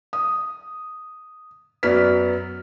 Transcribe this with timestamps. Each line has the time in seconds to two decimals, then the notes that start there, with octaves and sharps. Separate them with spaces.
0.13 D#6
1.83 F#2 F#3 B3 D5 F6 B6